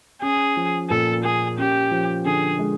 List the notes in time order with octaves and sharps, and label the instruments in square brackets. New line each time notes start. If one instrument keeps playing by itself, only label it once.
[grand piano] C#4 [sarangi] G#4
[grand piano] F3
[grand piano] A#2 [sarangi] A4
[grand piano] A#3 [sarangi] G#4
[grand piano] C#4 [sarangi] G4
[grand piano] F3
[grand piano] D3 [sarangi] G#4
[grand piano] G#3